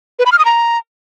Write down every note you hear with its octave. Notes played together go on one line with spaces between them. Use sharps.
B4
B5
F6
D#6
A#5